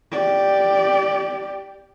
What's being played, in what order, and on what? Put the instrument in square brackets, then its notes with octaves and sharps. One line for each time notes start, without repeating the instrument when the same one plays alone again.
[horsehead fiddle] G4 D5